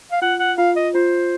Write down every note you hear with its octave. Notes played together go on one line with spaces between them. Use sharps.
F5
F4 F#5
F#5
F4 F5
D#5
F4 C5